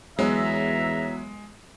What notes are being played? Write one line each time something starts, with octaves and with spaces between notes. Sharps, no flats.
E2 F#3 G#3 B3 E5 A#5